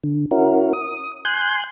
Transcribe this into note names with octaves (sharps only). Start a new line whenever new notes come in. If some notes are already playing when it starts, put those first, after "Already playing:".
D3
C#4 E4 F#4 A#4
D#6
G#5 C6 F#6 G6